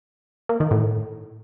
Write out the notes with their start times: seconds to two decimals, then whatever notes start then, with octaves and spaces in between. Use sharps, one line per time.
0.49 A#3
0.60 D#3
0.71 A2